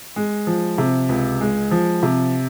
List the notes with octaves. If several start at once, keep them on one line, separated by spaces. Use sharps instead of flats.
G#3
F3
C3
C#2
G#3
F3
C3